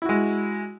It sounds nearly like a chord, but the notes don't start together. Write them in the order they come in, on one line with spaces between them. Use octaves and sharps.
E4 F#4 G#3